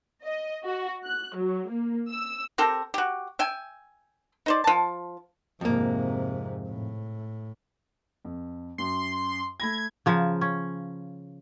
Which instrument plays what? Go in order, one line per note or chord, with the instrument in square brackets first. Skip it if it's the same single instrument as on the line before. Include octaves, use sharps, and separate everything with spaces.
[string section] D#5
F#4
F#6
F#3
A#3
E6
[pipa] C4 G4 A4 A#4
F#4 G4
E5 G5 G#5
D#4 C5 D5
F3 A5
[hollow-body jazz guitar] F2 A#3 [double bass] G#2 C3
[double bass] A2
[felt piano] F2
[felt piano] F#2 [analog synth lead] C6
[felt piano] A3 B5 A#6 [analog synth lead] G#6
[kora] C#3 F3 A#4
C#4